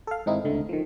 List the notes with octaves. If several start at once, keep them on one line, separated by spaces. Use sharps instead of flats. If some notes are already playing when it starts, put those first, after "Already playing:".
A4 F5
G#2 D#3 C4 D#4 E4
C#2 D3 A3
D#3 F3